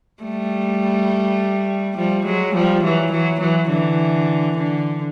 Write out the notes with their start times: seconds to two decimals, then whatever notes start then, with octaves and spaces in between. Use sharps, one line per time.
0.23 G3 A3
1.96 F3 G3
2.25 F#3 G#3
2.54 F3 G3
2.83 E3 F#3
3.11 E3 F#3
3.40 E3 F#3
3.69 D3 E3
4.57 D3